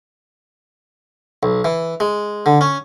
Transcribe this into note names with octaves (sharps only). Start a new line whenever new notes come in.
B1
E3
G#3
D3
C#4